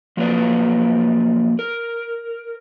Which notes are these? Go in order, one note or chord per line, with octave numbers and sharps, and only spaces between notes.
F3 F#3 A#3 B4 D5
A#4